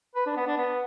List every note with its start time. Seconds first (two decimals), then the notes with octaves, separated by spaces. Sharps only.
0.15 B4
0.26 D4
0.37 B3
0.47 D4
0.58 B3